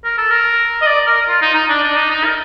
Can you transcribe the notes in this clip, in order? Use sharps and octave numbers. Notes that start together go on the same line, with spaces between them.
A#4
A4
A#4
D#5
D5
A#4
F4
D#4
D#4
D4
D4
D#4
D#4
A#4